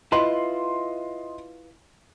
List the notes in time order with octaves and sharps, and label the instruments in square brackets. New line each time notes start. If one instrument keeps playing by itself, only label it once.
[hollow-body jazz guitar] E4 F4 B4 [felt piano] D#5 C6